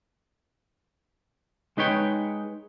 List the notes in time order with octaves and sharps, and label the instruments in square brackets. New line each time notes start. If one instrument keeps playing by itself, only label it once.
[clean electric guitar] G#3 D#4 B4 C#5 G5